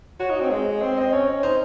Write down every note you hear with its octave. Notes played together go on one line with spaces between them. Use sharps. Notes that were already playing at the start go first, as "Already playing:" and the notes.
F#4 C#5
D#4
C4
G#3
C4
C4 D#5
C#4 C#5
D#4 C5